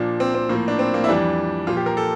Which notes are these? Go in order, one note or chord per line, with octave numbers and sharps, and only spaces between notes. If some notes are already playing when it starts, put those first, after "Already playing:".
Already playing: A#2 F3 D4
C4
C4
A2 F3 A#3
D4
C4
A#3
E4
F2 E3 G3 D4
A#2 F3 F4
G4
A#4
A4